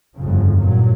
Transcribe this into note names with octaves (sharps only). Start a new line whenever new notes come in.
G1 F2 C#3
G2 A#2 F#3